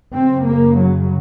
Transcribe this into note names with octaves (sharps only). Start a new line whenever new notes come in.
F#2 C#3 C4
A#3
F#3